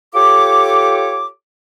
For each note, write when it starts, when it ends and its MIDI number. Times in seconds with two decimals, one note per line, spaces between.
0.15 1.28 65
0.15 1.28 67
0.15 1.28 69
0.15 1.28 73
0.15 1.28 86